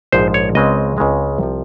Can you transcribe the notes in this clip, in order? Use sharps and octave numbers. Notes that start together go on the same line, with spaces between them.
A#1 G#2 F3 G#3 C5
C#5
C#2 C#3 G#3 C4 D#5
C#2 C#3 G#3 C4
C2 C3 F3